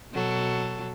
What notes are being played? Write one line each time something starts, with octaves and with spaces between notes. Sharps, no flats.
B2 F#3 A4